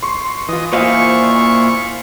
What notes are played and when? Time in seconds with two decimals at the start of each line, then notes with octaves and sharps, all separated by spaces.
0.03 C6 C#6
0.49 E3 F4 D#5
0.73 A#2 E4 F4 C5 D#5 F5 G#5 C#6